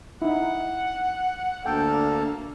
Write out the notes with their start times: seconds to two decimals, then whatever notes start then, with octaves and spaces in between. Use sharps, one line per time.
0.22 D#4 E4 F#5
1.66 D2 A#3 D4 A4 G5